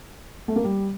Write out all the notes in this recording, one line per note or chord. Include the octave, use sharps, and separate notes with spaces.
A3
A#3
G3